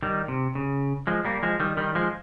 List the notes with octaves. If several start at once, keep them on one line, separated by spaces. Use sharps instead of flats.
D#3 G3
C3
C#3
F3 G#3
G3 A#3
F3 G#3
D#3 G3
D#3 G3
F3 G#3